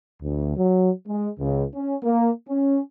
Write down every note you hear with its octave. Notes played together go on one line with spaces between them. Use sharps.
D2
F#3
G#3
C#2
C#4
A#3
C#4